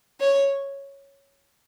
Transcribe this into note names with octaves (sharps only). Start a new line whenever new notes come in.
C#5